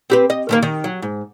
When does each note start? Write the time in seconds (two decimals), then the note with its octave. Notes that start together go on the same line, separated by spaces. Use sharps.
0.10 C4 G4 B4
0.30 D#5
0.49 D#3 A3 A#3
0.62 D#3
0.84 F#3
1.02 G#2